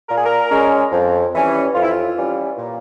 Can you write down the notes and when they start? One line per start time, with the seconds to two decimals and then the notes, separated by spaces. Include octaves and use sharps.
0.09 A#2 A#4
0.16 G#4
0.25 A#4
0.50 G#3 C#4
0.92 F2
1.34 E3 G3 C#4
1.74 F2 F4
1.83 E4
1.90 F4
2.17 E3 G3 C#4
2.58 A#2